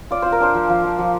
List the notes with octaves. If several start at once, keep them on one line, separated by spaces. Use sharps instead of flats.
F4 D5
F4 C5
A#4
D4 C5
F3
F3
F3
F3